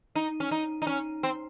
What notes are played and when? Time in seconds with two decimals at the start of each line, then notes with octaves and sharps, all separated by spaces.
0.15 D#4
0.40 C#4
0.51 D#4
0.82 D#4
0.87 C#4
1.23 C4